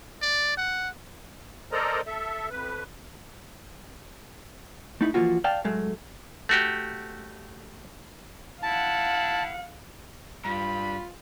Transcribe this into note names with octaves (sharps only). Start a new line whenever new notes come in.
D5
F#5
A4 A#4 C5 D5 D#5 A#5
A4 E5
F2 B4
A3 D#4 E4
E3 F3 A#3 F4 F#4
D5 F5 G5 A5
A2 F#3 G#3 A3
A3 F#4 G4
E4 F5 F#5 A5
G2 F4 B5